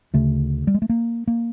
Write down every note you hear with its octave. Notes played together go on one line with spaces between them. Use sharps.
D2 C#3 A3
G3
G#3
A3
A#3
A#3